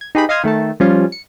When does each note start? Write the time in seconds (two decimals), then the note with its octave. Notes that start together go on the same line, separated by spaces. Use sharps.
0.01 G#6
0.15 D#4 G4 G#4 B4 G5 B5
0.29 D#5 F5 C6 D#6 F6 G#6
0.44 D#3 A3 A4 A5
0.80 F3 G3 C#4 F4
1.12 C#7